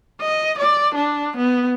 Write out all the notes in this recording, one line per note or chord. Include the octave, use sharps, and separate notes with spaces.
D#5
D5
D4
B3